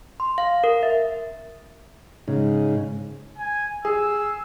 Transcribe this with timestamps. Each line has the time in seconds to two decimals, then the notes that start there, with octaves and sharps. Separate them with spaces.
0.20 C6
0.38 F5
0.64 A#4
0.83 E5
2.28 G#2 C#3
3.38 G#5
3.85 G#4 E6